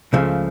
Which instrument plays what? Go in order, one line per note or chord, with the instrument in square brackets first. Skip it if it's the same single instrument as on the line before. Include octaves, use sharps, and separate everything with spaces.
[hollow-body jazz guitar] C#2 C#3 F3 A3